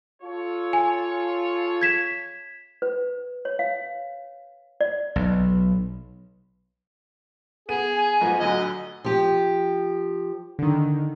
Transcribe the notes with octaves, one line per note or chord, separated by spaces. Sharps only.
F4 A4 C#5
G#5
G#6 B6 E7
B4
C#5
F5
D5
B1
B3 G#4 D#7
G#5
G#2 F3 B3
A2 D3 F#3 D#5
F3 G4
D3 D#3